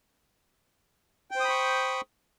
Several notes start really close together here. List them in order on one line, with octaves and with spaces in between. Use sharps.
G5 C5 D#6 B5 C#6